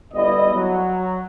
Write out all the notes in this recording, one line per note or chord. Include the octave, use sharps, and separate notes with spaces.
G1 G3 B3 E4 D#5
F#3